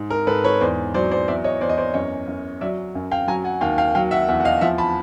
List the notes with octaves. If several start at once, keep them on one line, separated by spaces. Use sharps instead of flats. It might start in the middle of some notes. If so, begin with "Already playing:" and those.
Already playing: G#2
A#4
G#2 A4 B4
B4 C#5
E2 C5 D5
F#3 C5 D5
C5 D5
E2 D5 E5
C#5 D#5
E2 C5 D5
D#5
C5 D5
F#2 C#5 D#5
F#2
F#3 D5 E5
F#2
F5 G5
F#3 G#5 A#5
F#5 G#5
D#2 F5 G5
F5 G5
F#3 F5 G5
E5 F#5
E2 E5 F#5
F#5
D#5 F5
F3 E5 F#5
A5 B5